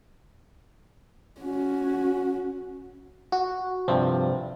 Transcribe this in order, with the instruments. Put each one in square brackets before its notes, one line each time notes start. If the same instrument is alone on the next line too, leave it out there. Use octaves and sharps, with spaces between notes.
[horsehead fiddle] C#4 F#4
[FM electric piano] F#4
[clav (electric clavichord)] G2 C3 F3 [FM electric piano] C4